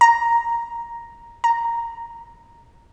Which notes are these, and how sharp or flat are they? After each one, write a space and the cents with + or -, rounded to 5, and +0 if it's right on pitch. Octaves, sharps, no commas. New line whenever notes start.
A#5 +5
A#5 -5